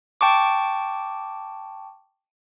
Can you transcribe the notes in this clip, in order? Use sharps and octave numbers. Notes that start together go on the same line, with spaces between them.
G5 A5 C#6 D6